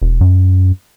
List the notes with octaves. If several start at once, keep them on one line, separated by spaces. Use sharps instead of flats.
E1
F#2